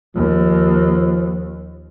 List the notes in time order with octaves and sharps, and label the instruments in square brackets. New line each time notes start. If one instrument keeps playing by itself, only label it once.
[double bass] D#2 [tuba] F3